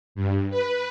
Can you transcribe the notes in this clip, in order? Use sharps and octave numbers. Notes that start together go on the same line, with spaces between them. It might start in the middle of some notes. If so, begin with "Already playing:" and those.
G2
B4